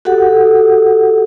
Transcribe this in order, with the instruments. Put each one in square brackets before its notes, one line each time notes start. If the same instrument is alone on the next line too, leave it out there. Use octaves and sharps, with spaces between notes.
[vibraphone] F#4 G4 A4 F#5